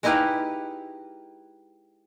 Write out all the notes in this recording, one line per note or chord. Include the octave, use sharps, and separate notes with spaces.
G#3 D#4 E4 G4 B4 F5